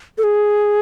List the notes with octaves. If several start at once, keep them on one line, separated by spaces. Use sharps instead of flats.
A4
G#4